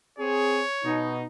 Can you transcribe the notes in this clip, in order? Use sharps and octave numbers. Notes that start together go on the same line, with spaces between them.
C4 G#4 C#5
B2 D#4